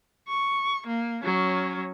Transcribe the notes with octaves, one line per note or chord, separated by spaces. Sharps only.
C#6
A#3
F#3 C#4